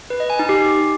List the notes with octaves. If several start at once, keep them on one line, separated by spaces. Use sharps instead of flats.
B4
D#5
G#5
D#4
G4